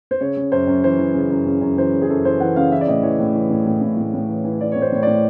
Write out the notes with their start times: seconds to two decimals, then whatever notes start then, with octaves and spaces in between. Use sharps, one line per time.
0.11 C5
0.20 C#3 C#5
0.37 C#3
0.52 F#2 C5
0.68 F#2
0.84 E3 C5
0.99 E3
1.14 C#3
1.31 F#2
1.46 C#3
1.61 F#2
1.77 E3 C5
1.93 C#3
2.02 G#4
2.09 F#2 A4
2.25 E3 C5
2.40 E3 F#5
2.56 C#3 F5
2.72 E3 E5
2.81 D5
2.87 A2 D#5
3.03 E3 C#5
3.19 A2
3.35 E3
3.50 A2
3.67 A2
3.82 A2
3.97 A2
4.14 A2
4.29 E3
4.44 E3
4.60 E3 D5
4.72 A2 C#5
4.82 C5
4.93 A2 C#5
5.03 A2 D5